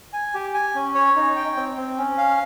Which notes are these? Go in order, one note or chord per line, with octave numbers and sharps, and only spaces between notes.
G#5
G4
G#5
C#4
C#5
D#4
G5
C4
C4
C#4
F5